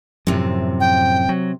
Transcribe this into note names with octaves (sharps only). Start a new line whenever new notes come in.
F#2 A2 C3 F3 C4
G5
F#3